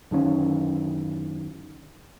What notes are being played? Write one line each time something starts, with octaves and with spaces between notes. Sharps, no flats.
F#2 D3 D#3 C#4